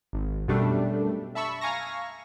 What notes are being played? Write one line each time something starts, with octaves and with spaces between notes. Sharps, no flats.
G#1
F#2 B2 G3 A3 D4
E5 A5 B5 C#6 E6
F5 G#5 A#5 C#6 A#6